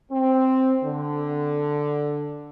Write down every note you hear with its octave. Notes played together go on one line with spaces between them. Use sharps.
C4
D3